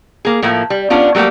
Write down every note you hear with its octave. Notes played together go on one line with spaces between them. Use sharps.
A#3 G#4
A2 F3 A3 A#3
G3
B3 C#4 D4 F4
F#3 G3 A3 A#3 G4